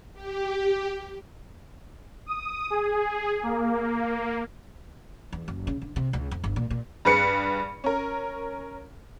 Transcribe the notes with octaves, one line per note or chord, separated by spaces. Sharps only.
G4
D#6
G#4
A#3
E2
F#1
C#3
D3
C3
C#2
F2
G1
A#2
A#2
G2 G#4 B4 C#7
C#4 A#4